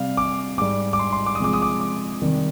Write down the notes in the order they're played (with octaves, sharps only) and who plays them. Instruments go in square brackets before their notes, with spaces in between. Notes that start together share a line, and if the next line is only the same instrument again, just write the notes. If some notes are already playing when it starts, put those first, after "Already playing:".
Already playing: [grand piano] C3 G3 F5
D6
G#2 G3 D6
D6
C6
C6
D6
D#6
C3 F3 G#3 D6
D#6
D6
D6
C3 D#3 G3